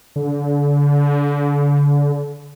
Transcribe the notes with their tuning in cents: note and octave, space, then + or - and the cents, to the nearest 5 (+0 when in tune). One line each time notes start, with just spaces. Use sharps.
D3 -35